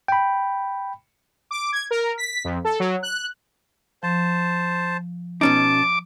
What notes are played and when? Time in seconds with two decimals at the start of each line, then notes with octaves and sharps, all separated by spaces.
0.08 G5 B5
1.51 D6
1.72 G#6
1.91 A#4
2.18 B6
2.44 F2
2.64 A4
2.80 F#3
3.03 F#6
4.03 F3 C5 A5
5.41 B2 C#4 D#4 A5 D6